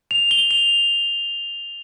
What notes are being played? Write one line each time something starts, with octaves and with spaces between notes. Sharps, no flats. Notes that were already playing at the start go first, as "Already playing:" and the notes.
F7
G7
F7